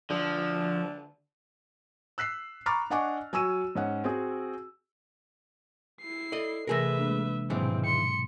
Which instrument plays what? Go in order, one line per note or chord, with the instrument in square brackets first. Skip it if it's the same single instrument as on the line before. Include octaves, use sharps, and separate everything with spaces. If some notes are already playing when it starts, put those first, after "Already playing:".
[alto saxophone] D3 [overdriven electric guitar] F3
[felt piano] E6 F#6 B6 C7
A#5 B5 C#6 D6 F6 A6
D4 D#5 F#5 G#5 C#6 D6
F#3 G#5 C#6 E6 D#7
G#2 C#4 F#5
C4 F#4 G#4
[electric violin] E4 C7
[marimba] A4 [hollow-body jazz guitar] D5 D#5
[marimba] C3 E3 A#6 [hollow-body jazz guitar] A3 G#4 A#4 [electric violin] B4 E5
[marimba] G#3 A#3 D4
[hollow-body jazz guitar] D#2 E3 G#3 [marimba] G#2 B2 F#3 [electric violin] C4
[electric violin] C6 C#7